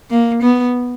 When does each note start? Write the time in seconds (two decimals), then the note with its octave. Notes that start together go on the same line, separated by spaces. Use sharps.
0.10 A#3
0.42 B3